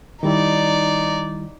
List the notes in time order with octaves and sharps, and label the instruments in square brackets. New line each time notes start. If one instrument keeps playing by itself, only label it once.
[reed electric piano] D#3 G3 E4 [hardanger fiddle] D#4 D5